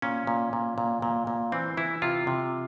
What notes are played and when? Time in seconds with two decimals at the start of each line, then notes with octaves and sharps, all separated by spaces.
0.02 A#2 C#4
0.27 A#2
0.53 A#2
0.78 A#2
1.02 A#2
1.27 A#2
1.52 E3 C4
1.77 E3 E4
2.02 C3 F4
2.27 C3